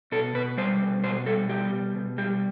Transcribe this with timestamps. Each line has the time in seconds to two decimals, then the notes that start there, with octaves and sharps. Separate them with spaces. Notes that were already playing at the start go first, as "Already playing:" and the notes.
0.12 B2 A4
0.35 B2 B4
0.58 G3 C5
0.81 B2
1.04 B2 C5
1.26 G3 A4
1.49 G3 G4
1.73 B2
1.95 B2
2.18 G3 G4